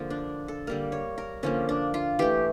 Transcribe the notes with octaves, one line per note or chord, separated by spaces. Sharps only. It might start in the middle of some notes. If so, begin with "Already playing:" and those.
Already playing: D3 F3 A#3
D4
A4
D3 G3 A#3 A#4
C#5
A#4
D3 F3 A#3 C#4
D4
F4
E3 A3 G4